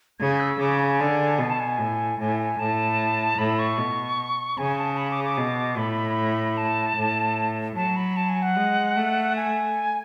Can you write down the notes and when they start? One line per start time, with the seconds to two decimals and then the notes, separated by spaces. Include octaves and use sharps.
0.19 C#3 G#6
0.40 E6
0.60 C#3 D6
0.79 G#5
1.00 D3
1.39 B2 G#5
1.49 A5
1.60 G#5
1.79 A2
2.19 A2 G#5
2.39 G#5
2.59 A2 A5
3.38 A2 B5
3.59 C#6
3.78 B2
4.58 C#3 G#5
4.78 A5
4.93 A5
4.97 B5
5.11 D6
5.25 D6
5.38 B2
5.78 A2 B5
6.57 A5
6.96 A2
7.76 F#3 A5
7.96 B5
8.16 A5
8.29 G#5
8.42 F#5
8.56 G#3
8.96 A3
9.36 G#5